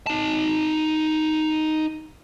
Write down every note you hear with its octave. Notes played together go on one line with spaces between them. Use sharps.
D#4 A5